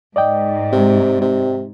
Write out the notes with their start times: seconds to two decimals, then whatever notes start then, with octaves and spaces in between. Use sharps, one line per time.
0.16 G#2 D5 D#5 G5
0.72 C3
1.21 C3